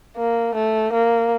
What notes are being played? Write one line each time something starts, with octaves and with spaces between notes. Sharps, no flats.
A#3
A3
A#3